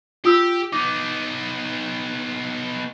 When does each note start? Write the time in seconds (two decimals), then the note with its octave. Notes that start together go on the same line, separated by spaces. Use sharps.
0.25 F4 G4 D#6 E6
0.73 B3 D#4 D6